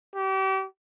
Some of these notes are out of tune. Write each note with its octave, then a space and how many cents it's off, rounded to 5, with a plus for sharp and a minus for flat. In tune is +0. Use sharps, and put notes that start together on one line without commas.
G4 -35